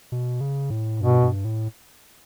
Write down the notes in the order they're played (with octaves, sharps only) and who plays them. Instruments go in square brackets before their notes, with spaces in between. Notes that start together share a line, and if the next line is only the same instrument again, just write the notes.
[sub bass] B2
C#3
A2
[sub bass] G2 [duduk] B2
[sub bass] G2
A2